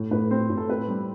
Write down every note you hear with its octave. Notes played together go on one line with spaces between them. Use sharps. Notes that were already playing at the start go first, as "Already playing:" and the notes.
Already playing: A2
A2 B4
C4 C5
A2
A4
C4 B4
G3